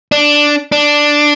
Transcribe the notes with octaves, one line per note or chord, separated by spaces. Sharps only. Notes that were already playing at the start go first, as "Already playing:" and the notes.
D4
D4